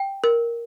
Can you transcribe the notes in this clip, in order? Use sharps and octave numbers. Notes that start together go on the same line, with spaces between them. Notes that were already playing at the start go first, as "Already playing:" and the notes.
Already playing: G5
A#4